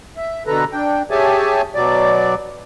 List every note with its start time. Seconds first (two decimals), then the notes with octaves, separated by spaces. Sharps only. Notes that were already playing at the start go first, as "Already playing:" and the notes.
0.17 E5
0.47 B2 D3 A4 B4 A#5
0.73 D4 G5
1.11 G4 G#4 C#5 E5 G#5 A5
1.75 B2 F#3 D5